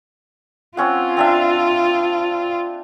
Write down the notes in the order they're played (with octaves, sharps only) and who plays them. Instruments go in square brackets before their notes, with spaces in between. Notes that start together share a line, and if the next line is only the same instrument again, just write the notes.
[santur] C4 C#4 F#5 [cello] F4
[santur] C4 D4 E5